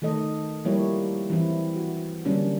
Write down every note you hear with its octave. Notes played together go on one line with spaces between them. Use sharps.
D#3 A3 A4 D#5
F3 G3 A#3 E4 G4 C#5
E3 F#3 C4 E4
F#4
D3 F#3 G3 A#3 C#4 D4